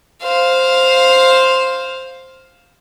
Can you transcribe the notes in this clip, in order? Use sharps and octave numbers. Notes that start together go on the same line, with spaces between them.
C5 F5